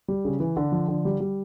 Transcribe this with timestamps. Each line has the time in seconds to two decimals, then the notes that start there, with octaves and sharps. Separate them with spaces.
0.08 G3
0.25 C#3
0.40 E3
0.57 D3
0.72 F3
0.88 D3
1.05 G3
1.20 G3